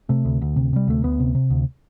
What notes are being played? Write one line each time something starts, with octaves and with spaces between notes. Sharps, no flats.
C3 A3
D2
D2
C3
C3 G3
D2 A3
D2 B3
C3
C3
D2